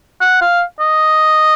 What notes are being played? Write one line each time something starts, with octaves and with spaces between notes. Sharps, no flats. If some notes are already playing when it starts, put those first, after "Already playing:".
F#5
F5
D#5